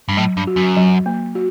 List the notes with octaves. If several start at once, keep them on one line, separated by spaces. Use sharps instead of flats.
G2
A2 F#3
G2
F#4
F#2
F#3
A#3
F#4